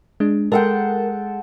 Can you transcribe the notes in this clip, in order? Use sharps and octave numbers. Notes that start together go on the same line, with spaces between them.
G#3 D4
G#3 A4 A#4 F#5 G5